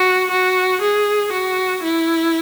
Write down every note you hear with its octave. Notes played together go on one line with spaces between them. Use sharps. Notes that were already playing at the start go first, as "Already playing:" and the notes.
Already playing: F#4
F#4
G#4
F#4
E4